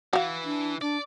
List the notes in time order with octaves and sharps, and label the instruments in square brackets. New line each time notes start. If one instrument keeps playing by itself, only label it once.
[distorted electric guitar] E3 [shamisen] F#4 F5
[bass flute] D4
[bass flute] D4 [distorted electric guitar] D5